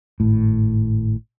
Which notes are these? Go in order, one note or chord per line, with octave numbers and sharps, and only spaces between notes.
G#1 A2